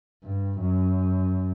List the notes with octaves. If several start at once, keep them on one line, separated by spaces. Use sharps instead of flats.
G2
F#2